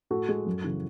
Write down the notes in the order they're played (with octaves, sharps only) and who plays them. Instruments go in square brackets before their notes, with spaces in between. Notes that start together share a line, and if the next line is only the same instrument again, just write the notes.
[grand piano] A2 F#4 A4
G#3
F#2
C#3 E3